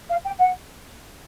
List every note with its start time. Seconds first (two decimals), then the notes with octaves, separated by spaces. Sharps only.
0.09 F5
0.24 G5
0.39 F#5